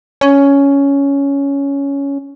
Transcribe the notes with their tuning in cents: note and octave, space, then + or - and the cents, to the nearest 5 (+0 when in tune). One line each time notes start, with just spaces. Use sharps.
C#4 +10